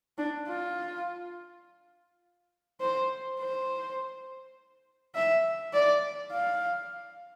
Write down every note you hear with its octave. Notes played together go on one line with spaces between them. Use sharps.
D4
F4
C5
C5
E5
D5
F5